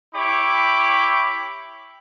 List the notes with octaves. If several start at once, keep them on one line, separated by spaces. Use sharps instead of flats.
E4 G4 C#5 B5 D6